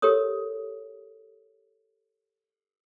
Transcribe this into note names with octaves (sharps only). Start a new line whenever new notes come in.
G4 A4 A#4 C#5 D#6